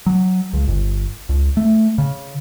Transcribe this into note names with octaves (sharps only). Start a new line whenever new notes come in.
F#3
C#2
G1
C#2
A3
C#3